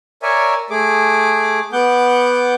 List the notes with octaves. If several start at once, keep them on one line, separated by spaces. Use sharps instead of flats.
A#4 C#5 D5 E5 G#5
A3 G#4 D6
B3 F#5 D6 G6